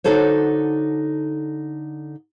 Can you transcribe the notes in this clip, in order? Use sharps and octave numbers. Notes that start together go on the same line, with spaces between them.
D3 D#4 F#4 A4 C5 C#5